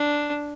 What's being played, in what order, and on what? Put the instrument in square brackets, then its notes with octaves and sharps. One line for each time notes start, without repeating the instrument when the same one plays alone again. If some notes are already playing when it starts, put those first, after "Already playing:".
Already playing: [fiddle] D4